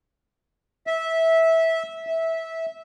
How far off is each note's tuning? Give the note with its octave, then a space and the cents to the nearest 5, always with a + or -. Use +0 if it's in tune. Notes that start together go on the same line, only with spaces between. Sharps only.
E5 -15
E5 -15